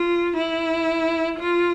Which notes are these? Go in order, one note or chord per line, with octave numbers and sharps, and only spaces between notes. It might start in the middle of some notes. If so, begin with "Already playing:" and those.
Already playing: F4
E4
F4